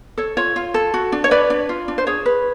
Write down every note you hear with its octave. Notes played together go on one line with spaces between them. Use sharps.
A4 C#5
F4 C#5
F4
A4
F#4
D4
C#5
B4 D5
D4
F4
D4
C5
G#4 C#5
B4